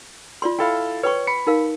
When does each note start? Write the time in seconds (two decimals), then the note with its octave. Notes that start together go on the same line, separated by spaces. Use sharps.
0.42 F4 D5 C6
0.59 E4 A4 F5 G5 B5
1.03 B4 C#5 G5 C#6
1.27 B5 C#7
1.47 D#4 A#4 F5